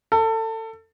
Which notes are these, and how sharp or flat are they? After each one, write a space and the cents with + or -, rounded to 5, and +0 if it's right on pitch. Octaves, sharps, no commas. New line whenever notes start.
A4 +25